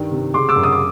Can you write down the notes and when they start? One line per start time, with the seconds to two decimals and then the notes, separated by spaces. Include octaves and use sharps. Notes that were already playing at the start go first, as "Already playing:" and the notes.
Already playing: G2 D#3
0.11 C3
0.34 C#3 C6 D6
0.49 D6 E6
0.56 F#2
0.63 D#6
0.72 D6